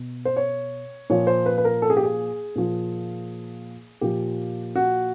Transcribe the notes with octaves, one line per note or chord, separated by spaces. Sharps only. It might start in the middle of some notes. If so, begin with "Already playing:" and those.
Already playing: B2
C5
C#5
A#2 F3 C#5
C5
B4
B4
A#4
A4
G#4
G4
G#4
A#2 F3
A#2 F3 G4
F#4